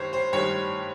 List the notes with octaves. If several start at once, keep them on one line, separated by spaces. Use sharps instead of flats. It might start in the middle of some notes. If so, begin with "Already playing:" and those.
Already playing: G2 D#3 G3 C5 C#5
C5
G2 D#3 G3 C#5